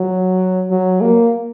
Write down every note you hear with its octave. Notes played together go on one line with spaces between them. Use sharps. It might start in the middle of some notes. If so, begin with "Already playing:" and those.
Already playing: F#3
F#3
A#3